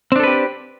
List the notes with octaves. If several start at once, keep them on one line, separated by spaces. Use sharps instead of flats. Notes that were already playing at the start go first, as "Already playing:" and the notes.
C4 D4 G4 A4 B4